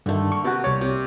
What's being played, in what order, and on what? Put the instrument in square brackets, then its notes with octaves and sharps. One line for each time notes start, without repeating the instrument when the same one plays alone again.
[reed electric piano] G2 D#3 [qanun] D3 A3
[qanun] A#3 [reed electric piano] C#6
[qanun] C3 D5 [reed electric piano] B3 F#4
[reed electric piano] C2 C#5 [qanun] D5
[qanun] C3